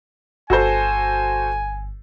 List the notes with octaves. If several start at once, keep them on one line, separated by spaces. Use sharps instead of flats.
G1 F#4 A4 C5 G#5